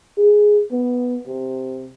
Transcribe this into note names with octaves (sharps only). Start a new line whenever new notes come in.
G#4
B3
C3